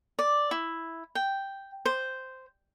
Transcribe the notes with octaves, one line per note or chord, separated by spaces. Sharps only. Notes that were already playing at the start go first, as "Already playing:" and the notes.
D5
E4
G5
C5